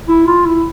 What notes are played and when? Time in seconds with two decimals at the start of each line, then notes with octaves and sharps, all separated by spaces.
0.08 E4
0.27 F4
0.46 E4